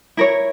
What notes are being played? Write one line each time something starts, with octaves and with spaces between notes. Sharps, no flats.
E4 A#4 C#5